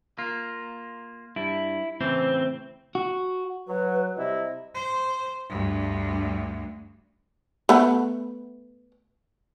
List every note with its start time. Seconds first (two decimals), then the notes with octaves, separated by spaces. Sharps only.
0.18 A#3 F4
1.36 G2 E4
2.01 A2 C#3 E3 C4
2.95 F#4
3.68 F#3 B4
4.16 C3 G3 E4 D#5
4.75 C5
5.50 D2 G2
7.69 A3 B3